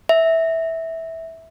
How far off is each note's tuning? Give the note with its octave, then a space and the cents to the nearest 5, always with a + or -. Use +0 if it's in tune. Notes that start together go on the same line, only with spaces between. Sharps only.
E5 -15